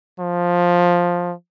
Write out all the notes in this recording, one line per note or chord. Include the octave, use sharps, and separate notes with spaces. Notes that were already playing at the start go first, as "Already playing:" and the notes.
F3